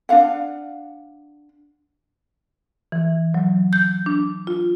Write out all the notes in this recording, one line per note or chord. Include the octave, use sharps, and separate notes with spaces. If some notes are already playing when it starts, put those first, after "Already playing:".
D4 F#4 F5 F#5
E3
F#3
G6
D4
F4